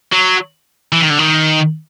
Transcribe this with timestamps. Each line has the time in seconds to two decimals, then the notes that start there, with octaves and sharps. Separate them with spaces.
0.12 F#3
0.92 E3
1.01 D#3
1.10 D3
1.19 D#3